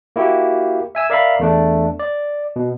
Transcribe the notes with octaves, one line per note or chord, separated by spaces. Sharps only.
A#3 E4 F#4 G4
E5 G#5 E6
A#4 D5 E5 F5 A#5 B5
E2 A3 D4
D5
B2